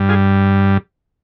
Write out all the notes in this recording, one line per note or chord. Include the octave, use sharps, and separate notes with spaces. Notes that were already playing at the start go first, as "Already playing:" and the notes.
Already playing: G2 G3
F4 G#4